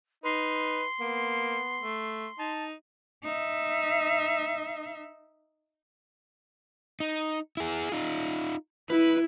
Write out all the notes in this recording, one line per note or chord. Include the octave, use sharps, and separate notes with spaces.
D#4 B4 C6
A#3 B3
A3
D#4 A5
D#4 E5
D#4
E4 G#4
D#4 F4
E4 B4